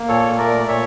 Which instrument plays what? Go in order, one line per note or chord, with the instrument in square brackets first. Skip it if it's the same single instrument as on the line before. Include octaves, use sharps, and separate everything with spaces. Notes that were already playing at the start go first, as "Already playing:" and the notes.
Already playing: [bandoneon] A#3
A#2 A4 C#5
A3 A#4 D5
D5
A#2 C#5 E5